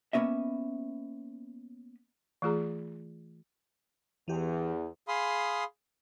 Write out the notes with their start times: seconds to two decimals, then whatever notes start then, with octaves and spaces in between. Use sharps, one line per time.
0.13 A#3 B3 C#4 D#5 E5
2.42 E3 A3 F4 G#4 A#5
4.28 E2 E3 G4
5.08 G#4 F5 B5 C6 D#6